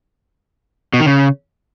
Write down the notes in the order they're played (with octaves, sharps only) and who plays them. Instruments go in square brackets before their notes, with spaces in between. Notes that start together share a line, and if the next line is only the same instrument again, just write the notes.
[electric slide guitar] B2
D#3
C#3